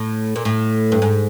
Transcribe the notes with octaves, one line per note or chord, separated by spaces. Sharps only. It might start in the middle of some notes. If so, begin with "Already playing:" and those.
Already playing: A2
A#2
A2
G2
G#2